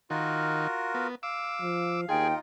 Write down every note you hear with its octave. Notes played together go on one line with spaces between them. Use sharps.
D#3 F4 F#4 A#4
B3
F5 D6 E6
F3
D#2 D#4 F4 G#4 G5